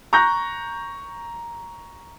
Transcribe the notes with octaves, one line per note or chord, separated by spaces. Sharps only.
A#5 C#6 F#6 G6 A#6